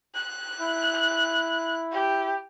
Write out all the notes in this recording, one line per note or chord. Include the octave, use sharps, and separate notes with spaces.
F#6
E4
G4